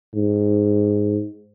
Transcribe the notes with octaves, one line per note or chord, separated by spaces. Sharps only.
G#2